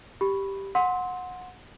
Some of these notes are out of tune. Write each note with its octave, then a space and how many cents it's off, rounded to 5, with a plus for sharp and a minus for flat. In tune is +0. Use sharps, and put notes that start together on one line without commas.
G4 +0 B5 +0
F#5 -20 C6 +0 E6 -40